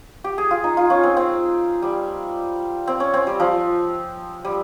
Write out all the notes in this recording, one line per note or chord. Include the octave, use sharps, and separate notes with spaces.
G4
G#4
F4
D#4
F4
C#4
C4
C4
G3
C4
C#4
C4
G3
F3
G3